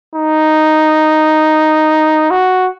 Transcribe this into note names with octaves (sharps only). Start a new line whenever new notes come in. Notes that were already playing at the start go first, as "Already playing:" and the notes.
D#4
F#4